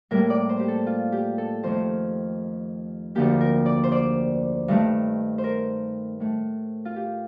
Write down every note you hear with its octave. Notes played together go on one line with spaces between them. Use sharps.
A2 G3 A#3 A#4
D5
C5
G4
A4
F4
G4
A4
F2 D#3 A3 C5
D2 D3 F3 A#3 G4
A#4
D5
C5
D5
G2 D#3 A3
C5
A#4
A2 A3
F4
G4